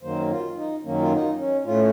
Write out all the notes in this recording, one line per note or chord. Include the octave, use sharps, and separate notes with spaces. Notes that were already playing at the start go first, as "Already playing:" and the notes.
F#2 D#3 F#3 A#3 C5
F4
D#4
F#2 D#3 F#3 A#3 C#4
F4
D#4
C#4
A2 A3 C#4 F4